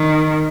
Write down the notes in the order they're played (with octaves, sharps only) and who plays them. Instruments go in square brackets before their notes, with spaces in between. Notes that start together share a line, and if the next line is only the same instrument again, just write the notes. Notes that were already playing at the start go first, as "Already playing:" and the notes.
Already playing: [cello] D#3